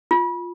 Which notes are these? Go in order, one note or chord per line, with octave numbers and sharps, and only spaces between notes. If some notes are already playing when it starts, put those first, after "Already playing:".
F4